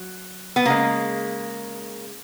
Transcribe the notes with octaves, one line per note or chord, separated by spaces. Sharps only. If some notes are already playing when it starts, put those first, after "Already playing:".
Already playing: F#3
B3
C#3 G#3 A#3